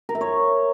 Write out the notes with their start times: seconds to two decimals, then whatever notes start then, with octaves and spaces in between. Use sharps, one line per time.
0.09 A#4
0.15 E5
0.21 C#5